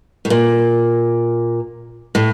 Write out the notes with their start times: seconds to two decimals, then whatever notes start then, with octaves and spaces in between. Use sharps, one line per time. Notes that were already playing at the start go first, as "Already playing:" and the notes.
0.25 A2
0.30 A#2
2.15 A2